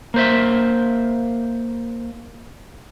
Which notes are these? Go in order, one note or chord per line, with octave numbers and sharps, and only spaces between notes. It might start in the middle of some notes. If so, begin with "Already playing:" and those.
A#3 C5 E5